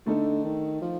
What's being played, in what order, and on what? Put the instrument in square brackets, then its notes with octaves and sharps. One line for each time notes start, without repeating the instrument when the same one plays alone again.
[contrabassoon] D3 [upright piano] A3 D#4 A4
[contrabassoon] D#3
F3